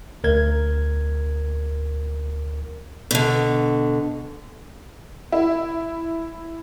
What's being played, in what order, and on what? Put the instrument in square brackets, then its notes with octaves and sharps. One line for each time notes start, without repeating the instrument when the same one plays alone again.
[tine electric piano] D2 A#4 G#6
[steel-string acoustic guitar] B2 D3
[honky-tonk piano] E4